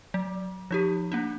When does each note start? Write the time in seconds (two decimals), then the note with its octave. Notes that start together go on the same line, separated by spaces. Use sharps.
0.14 F#3
0.71 F3 D#4 G4
1.12 A#3 D4 D#4